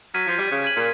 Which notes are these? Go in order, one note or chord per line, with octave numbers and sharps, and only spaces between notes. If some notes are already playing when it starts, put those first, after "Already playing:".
F#3 F6 G#6 B6 D#7
F3
G3
C#3
G#6 B6 D#7 F#7
A#2